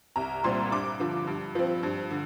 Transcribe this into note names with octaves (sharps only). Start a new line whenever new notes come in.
C2 A#5
A#2 G3 C4 C6
G2 D6
D3 F3
G2
F3 C4
G2
D3